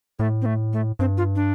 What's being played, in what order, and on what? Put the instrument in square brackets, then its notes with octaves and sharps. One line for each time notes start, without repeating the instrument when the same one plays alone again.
[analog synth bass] A2 [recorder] A3
[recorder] C4
A3
A3
[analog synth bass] G2 [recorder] C4
[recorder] F4
D4